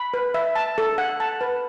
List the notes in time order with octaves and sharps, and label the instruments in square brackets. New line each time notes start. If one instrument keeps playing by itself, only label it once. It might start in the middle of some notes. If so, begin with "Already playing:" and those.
Already playing: [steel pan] B5
B4
E5
A5
A4
F#5
A5
B4